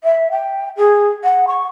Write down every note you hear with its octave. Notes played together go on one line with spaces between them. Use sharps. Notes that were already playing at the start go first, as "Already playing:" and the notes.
E5
G5
G#4
F#5
C#6